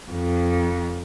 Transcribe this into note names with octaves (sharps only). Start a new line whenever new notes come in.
F2